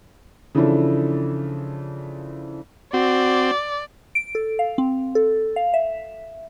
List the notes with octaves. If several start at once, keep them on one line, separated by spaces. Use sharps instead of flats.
C#3 E3 F3 D4 E4 A4
C4 F#4 D5
D7
A4
F5
C4
A4
F5
E5